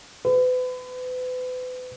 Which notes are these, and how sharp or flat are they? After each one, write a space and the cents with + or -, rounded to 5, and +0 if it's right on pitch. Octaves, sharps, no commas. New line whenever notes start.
B4 +35